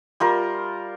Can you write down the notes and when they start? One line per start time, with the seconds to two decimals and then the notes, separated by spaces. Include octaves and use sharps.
0.20 G3 F4 A#4